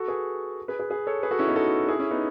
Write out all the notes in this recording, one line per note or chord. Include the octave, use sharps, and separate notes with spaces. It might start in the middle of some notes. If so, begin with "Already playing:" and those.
Already playing: F#4 A4
G#4 B4
G#4 B4
G#4 B4
G#4 B4
A4 C#5
G#4 B4
F#4 A4
C#4 E4
B3 D#4
F#4 A4
E4 G#4
C#4 E4
B3 D#4